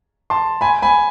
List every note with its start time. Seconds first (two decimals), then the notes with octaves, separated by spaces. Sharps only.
0.30 A5 C6
0.61 G#5 B5
0.82 G#5 B5